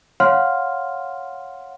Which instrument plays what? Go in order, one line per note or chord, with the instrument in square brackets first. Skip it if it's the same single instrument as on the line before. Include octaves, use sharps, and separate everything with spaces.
[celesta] C#5 F5 F#5 C6 F6